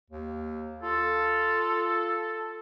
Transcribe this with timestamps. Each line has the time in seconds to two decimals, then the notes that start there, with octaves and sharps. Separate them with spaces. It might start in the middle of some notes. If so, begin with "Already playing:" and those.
0.10 D#2
0.83 F4 A4